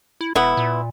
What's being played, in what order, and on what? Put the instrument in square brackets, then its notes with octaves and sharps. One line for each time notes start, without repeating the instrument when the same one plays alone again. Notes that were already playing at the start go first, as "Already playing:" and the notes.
[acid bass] E4
[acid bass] E1 [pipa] B3 E4
[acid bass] A#2